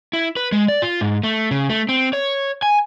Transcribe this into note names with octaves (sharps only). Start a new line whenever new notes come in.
E4
B4
G#3
D5
F4
G#2
A3
C#3
A3
C4
C#5
G#5